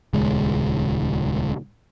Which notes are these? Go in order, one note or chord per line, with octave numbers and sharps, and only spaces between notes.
D#1 C#2 G#3